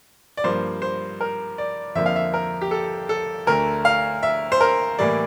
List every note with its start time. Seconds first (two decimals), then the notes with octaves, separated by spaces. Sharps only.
0.37 D5
0.44 G2 F3 A#3 C5
0.82 C5
1.21 A#4
1.58 D5
1.95 F2 D3 F3 A#3 E5
2.06 F5
2.16 E5
2.34 A#4
2.61 G4
2.71 A4
3.09 A4
3.47 D2 D3 A3 A#4
3.85 F5
4.23 E5
4.52 C5
4.61 A#4
4.99 A2 E3 G3 A#3 D5